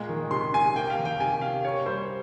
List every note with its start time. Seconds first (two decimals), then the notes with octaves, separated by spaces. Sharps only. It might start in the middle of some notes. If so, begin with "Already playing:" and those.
Already playing: A#2 G#3
0.09 D#3
0.31 C3 C6
0.53 C3 G#5
0.76 A#3 G5
0.90 F5
0.98 D#3
1.05 G5
1.20 C3 G#5
1.41 C3 F5
1.64 A#3 C#5
1.86 G3 C5